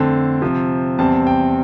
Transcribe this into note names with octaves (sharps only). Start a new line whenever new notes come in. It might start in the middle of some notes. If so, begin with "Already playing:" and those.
Already playing: F2 D3 A3 C4 A5
C3 F3 C4
E2 C3 G3 C4 A5
G5